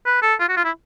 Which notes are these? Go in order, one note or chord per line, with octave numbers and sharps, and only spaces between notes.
B4
A4
F4
F#4
F4
E4